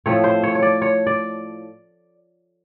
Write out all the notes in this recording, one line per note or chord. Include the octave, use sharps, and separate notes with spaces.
A2 F3 A3 C4 C#5
C5
C#5
C#5
D5
C#5
D5